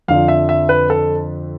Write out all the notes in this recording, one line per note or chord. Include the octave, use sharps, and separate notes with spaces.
F2 D3 F3 F5
E5
E5
B4
A4